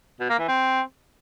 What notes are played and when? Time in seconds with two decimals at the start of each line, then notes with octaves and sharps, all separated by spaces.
0.20 B2
0.30 A#3
0.39 E3
0.48 C4